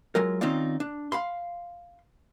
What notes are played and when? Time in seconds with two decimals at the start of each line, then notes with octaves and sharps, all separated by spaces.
0.15 F#3 G#3 F4 A#4
0.41 D#3 C4 C#4 D#4 F4 D5
0.80 D4
1.12 F5 B5 C6